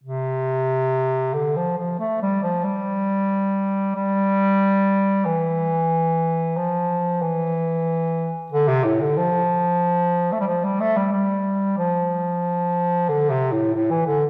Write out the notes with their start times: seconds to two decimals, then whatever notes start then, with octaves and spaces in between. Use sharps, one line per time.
0.04 C3
1.34 D3
1.56 F3
1.78 F3
2.00 A3
2.22 G3
2.43 F3
2.64 G3
3.95 G3
5.26 E3
6.57 F3
7.22 E3
8.52 D3
8.68 C3
8.85 A2
9.01 D3
9.17 F3
10.33 A3
10.40 G3
10.47 F3
10.64 G3
10.80 A3
10.97 G3
11.13 G3
11.78 F3
13.09 D3
13.30 C3
13.52 A2
13.74 A2
13.91 E3
14.07 D3